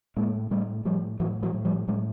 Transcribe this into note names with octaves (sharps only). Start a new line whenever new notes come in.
A2 G#3 A#3
A2 G3 A3
A2 F3 G3
A2 E3 F#3
E3 F#3
A2
F3 G3
A2 F#3 G#3